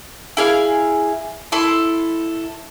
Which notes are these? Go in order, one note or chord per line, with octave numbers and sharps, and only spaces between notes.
E4 G#4 F5
E4 A4 C6